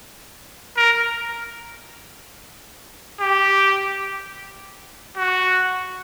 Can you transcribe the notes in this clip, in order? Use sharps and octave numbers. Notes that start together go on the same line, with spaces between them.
A#4
G4
F#4